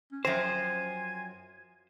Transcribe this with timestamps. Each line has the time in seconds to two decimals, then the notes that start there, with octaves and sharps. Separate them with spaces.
0.12 C#4
0.25 F#2 F3 C4 C5 G#5